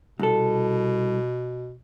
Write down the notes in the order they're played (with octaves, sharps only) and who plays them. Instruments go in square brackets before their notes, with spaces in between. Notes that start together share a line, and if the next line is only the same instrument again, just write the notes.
[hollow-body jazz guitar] C2 A4 [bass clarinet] B2